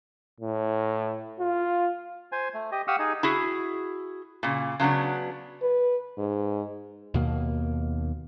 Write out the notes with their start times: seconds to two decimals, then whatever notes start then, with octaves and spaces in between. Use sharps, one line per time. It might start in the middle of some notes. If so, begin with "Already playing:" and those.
0.40 A2
1.40 F4
2.32 C5 G#5
2.54 A3
2.72 G4 D#5
2.88 G4 F5 F#5 C#6 D#6 E6
2.99 D#4 G#4
3.23 E4 F#4 G#4
4.43 A#2 C#3
4.80 C#3 F#3 B3 D4
5.62 B4
6.18 G#2
7.14 D#2 B2 A#3